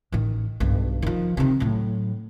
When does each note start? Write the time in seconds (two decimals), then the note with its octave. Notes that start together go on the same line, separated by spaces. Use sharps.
0.12 A1 D#3
0.60 B1 G2
1.02 D#3 F3
1.37 C3 D#3
1.60 A2 F#3